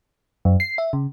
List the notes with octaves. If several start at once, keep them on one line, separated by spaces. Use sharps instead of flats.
F#2
C7
E5
C#3